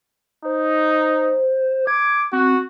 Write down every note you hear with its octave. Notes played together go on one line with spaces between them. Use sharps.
D#4 C5
D6 G#6
C4 F#4